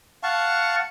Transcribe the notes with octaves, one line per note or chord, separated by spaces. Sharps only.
F5 F#5 A5 C#6